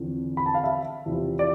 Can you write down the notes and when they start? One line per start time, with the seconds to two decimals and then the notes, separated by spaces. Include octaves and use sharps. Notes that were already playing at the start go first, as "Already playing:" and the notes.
Already playing: E2 D3 F3 C4
0.37 B5
0.46 A5
0.54 F5
0.64 E5
1.06 E2 C3 F3
1.39 D5